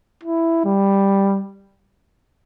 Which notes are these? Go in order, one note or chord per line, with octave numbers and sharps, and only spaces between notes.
E4
G3